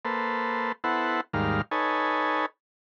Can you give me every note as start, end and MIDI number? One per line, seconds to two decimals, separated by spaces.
0.05 0.72 58
0.05 0.72 69
0.05 0.72 71
0.05 0.72 72
0.84 1.21 59
0.84 1.21 64
0.84 1.21 69
0.84 1.21 72
0.84 1.21 78
1.34 1.62 39
1.34 1.62 44
1.34 1.62 55
1.34 1.62 70
1.34 1.62 77
1.71 2.46 63
1.71 2.46 69
1.71 2.46 71
1.71 2.46 73
1.71 2.46 80